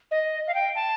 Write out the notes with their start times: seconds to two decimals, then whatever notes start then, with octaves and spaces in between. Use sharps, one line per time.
0.11 D#5
0.47 F5
0.54 G5
0.75 A5